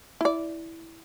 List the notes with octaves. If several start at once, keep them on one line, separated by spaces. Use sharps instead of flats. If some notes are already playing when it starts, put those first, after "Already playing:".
E4 D5